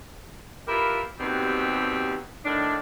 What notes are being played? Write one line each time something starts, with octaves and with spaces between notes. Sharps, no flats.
E4 F4 G4 A#4 B4
D#2 B2 G3 B3 C4
A2 D#3 D4